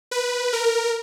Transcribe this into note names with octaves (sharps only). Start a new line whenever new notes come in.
B4
A#4